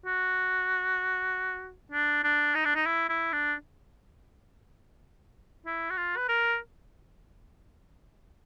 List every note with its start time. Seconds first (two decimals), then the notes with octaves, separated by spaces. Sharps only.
0.06 F#4
1.92 D4
2.24 D4
2.55 D#4
2.65 D4
2.75 D#4
2.86 E4
3.09 E4
3.33 D4
5.66 E4
5.90 F#4
5.97 F4
6.17 B4
6.29 A#4